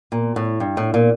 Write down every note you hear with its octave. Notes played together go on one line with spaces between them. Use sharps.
A#2
A2
G2
A2
A#2